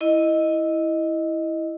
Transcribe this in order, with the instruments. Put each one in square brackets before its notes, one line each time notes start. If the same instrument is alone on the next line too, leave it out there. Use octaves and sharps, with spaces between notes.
[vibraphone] E4 D#5